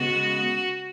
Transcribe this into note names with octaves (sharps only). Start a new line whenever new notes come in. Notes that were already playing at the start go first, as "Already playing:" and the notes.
Already playing: C#3 G#3 B3 F#4